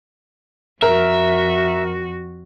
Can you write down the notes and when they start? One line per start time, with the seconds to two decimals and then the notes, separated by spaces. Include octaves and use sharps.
0.82 F2 F#4 A#4 E5